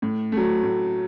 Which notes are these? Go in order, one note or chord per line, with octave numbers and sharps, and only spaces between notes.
A2
F#3 A3
A2